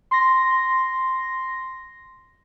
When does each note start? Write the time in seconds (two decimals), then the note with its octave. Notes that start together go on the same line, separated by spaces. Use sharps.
0.11 C6 A#6